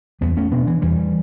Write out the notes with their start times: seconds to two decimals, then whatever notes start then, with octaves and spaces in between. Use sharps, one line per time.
0.21 E2 G3 B3
0.37 A3 C#4
0.52 B2 B3 D4
0.67 E3
0.82 E2 E3 G3